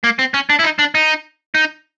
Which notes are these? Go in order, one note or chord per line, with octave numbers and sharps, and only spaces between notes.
A#3
C4
C#4
D4
E4
D#4
D4
D#4
D#4